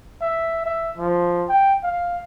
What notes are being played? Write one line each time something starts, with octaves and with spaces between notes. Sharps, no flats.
E5
E5
F3
G5
F5